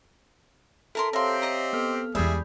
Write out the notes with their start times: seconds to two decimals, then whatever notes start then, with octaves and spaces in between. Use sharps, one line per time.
0.95 E4 A4 A#4 A5 C6
1.13 C4 G4 A#4 C#5 E5 F5 C6
1.42 D#5 A#5
1.73 B3 A4 F6
2.15 E2 G3 G#3 G#4 D5 E5 B5 G6